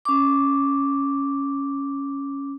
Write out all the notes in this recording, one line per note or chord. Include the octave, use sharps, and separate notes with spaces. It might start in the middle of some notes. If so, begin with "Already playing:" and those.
C#4 D6